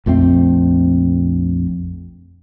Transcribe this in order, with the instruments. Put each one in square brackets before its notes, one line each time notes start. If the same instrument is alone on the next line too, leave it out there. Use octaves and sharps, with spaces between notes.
[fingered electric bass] A#1 F2 A3 C4